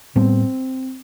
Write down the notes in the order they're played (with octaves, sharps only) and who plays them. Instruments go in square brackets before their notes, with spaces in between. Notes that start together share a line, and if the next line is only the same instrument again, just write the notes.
[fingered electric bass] A2 G3 B3 [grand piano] C4